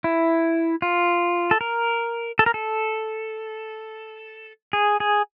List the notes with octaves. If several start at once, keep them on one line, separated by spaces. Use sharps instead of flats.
E4
F4
A4
A#4
A4
A#4
A4
G#4
G#4